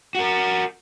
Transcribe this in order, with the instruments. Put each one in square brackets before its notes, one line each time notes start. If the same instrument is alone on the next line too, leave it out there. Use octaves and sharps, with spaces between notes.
[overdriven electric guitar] F#4 A#4